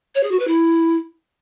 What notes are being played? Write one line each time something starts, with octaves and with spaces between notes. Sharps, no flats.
C#5
G#4
F#4
B4
E4